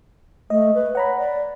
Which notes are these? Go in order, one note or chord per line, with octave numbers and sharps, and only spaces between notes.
A3 D#5
B4
C#5 F#5 A#5 B5
D5